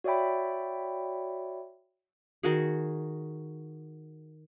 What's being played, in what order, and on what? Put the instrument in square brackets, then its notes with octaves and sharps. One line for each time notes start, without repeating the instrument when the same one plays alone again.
[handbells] F#4 C#5 D5 E5 G5 B5
[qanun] D#3 F#4 G#4